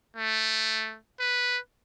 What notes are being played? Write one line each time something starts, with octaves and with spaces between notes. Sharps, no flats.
A3
B4